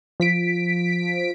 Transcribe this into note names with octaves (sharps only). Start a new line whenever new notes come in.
F3 B6 D7